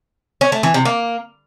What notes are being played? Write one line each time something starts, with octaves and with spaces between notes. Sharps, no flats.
C#4
A3
E3
C3
A#3